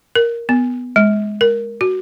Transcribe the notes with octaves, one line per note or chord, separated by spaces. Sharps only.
A#4
B3
G#3
A#4
F#4